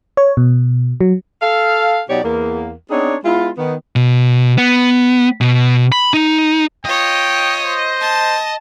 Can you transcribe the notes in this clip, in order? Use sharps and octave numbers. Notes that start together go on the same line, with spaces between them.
C#5
B2
F#3
A4 F5
B2 F#3 D#4 G4 C#5 D5
E2 A#3
B3 C4 D4 D#4 G#4 C#5
G#3 B3 E4 F4
D#3 B3
B2
B3
B2
B5
D#4
F4 C#5 D#5 G5
C5
A5